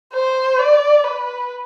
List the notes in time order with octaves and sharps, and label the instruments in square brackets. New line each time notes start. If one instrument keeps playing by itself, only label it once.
[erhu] C5
D5
B4